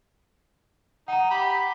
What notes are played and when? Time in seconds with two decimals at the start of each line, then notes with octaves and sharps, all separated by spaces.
1.08 D#4 F#5 A#5
1.31 G4 B5